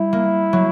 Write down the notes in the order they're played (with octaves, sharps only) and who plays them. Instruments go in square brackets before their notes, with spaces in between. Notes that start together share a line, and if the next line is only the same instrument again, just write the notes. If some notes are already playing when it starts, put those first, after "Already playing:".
Already playing: [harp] G3 [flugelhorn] E4
[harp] A#3
F#3